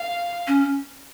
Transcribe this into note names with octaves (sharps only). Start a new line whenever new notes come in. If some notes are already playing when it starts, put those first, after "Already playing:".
Already playing: F5
C#4